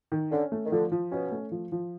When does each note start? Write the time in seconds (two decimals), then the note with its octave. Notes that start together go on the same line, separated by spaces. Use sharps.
0.12 D#3
0.31 D3 C#4
0.52 A3
0.65 D#3
0.72 D3 F3
0.92 F3
1.12 B2 C#4
1.32 A3
1.52 F3
1.72 F3